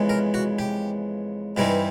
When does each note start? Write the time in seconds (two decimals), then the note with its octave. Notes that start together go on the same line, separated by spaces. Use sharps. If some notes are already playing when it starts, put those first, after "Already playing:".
Already playing: F2 C#3 E3 G#3 B3
0.09 A#4
0.34 F#4
0.59 G4
1.57 G2 E3 G3 C4 D#4 G4